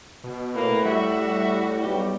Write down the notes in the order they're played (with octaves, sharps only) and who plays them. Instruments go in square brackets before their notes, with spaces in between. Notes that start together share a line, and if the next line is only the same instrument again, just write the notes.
[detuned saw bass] B2
[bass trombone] A2 [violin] A#3 [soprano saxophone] B4
[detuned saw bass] G3 [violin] F#4 [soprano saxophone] E5
[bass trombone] B1 [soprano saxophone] G4